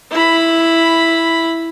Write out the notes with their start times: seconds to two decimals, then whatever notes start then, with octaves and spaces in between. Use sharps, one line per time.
0.11 E4 B5